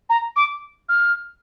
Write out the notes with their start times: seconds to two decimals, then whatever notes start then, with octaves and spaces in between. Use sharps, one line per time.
0.09 A#5
0.36 D6
0.89 F6